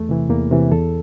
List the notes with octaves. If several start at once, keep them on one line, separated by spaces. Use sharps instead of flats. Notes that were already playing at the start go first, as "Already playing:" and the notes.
Already playing: E2 A3
C3 E3
E2 A#3
C3 E3
E2 A4